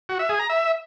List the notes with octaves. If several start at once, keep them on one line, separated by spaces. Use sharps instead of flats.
F#4
E5
G#4
A#5
E5